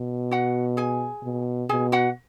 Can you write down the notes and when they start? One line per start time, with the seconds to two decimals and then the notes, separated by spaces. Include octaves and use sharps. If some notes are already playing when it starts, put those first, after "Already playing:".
Already playing: B2
0.31 F#4 F#5
0.77 G#4 G#5
1.23 B2
1.69 B2 G#4 G#5
1.92 F#4 F#5